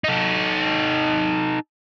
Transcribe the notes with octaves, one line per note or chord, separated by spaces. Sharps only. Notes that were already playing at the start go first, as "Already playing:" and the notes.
D#4 A4